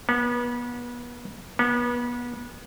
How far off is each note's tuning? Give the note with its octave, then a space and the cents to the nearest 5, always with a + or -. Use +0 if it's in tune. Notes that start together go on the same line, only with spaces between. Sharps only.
B3 -30
B3 -30